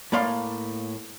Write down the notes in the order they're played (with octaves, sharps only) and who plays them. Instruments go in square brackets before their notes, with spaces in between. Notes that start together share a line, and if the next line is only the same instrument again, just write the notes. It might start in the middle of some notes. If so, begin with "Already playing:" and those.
[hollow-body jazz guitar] A2 A#3 D5 F5 C6